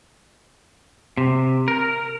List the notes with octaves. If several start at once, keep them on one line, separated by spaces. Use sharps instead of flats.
C3
A#4